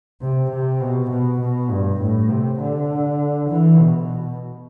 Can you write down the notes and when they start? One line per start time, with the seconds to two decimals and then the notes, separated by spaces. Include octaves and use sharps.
0.21 C3
0.51 C3
0.81 B2
1.10 B2
1.40 B2
1.70 G2
2.00 A2
2.30 C3
2.61 D3
3.50 E3
3.80 B2